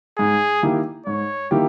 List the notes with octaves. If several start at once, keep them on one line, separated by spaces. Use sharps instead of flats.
G#2 G#4
D#3 A#3 E4 G4
G#2 C#5
D#3 A#3 E4 G4